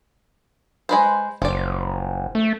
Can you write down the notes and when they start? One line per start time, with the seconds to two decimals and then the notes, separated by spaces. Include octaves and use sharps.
0.89 G#3 B4 C5
1.42 F#1 F3 D5
2.35 A3